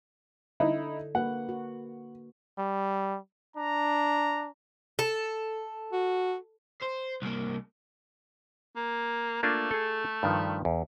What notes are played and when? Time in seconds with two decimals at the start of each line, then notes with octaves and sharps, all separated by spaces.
0.60 D3 D#4 E4
1.15 A#3 F#4 B4 F#5
1.49 F#4
2.58 G3
3.56 D4 A#5
4.99 A4
5.92 F#4
6.82 C5
7.22 C2 A#3
8.76 A#3
9.43 A3 A#3 D4 F4
9.71 G#4 A4
10.23 G2 D#3 F3
10.65 E2